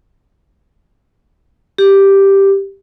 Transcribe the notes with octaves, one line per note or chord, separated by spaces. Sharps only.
G4